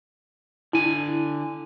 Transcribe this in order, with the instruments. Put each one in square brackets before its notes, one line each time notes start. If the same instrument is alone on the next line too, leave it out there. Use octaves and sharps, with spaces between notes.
[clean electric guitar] D3 G#5 [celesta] E4